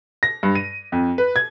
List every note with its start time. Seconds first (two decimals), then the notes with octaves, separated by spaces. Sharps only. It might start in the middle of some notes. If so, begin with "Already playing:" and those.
0.23 A#6
0.43 G2
0.55 D#7
0.92 F2
1.18 B4
1.36 G#6